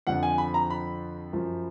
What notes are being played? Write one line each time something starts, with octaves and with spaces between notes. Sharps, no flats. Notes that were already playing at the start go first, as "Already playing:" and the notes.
F2 D3 F3 F#5
G#5
B5
A#5
B5
F#2 F3